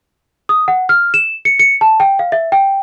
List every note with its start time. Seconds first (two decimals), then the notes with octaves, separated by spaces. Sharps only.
0.49 D#6
0.68 F#5
0.89 F6
1.14 E7
1.45 C#7
1.59 C#7
1.81 A5
2.00 G5
2.19 F5
2.32 E5
2.52 G5